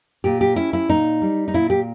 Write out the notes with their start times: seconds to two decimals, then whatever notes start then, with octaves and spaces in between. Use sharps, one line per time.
0.24 A#2 G4
0.41 G4
0.56 C#4 E4
0.73 E4
0.89 A#2 D#4
1.22 G3
1.48 D#4
1.54 A#2 E4
1.70 G4